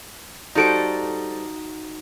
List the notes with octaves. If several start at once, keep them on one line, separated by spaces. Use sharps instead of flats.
G3 D#4 F#4 A4 C5 D7